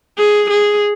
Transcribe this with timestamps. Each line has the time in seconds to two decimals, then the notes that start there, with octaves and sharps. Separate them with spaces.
0.18 G#4
0.50 G#4